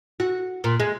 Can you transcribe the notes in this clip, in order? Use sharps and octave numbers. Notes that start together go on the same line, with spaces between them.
F#4
A#2
G#3